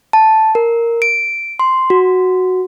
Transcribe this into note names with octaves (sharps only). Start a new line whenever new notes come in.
A5
A#4
D7
C6
F#4